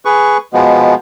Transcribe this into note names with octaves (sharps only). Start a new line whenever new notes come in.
G#4 B4 C#6
B2 F3 G#3 B3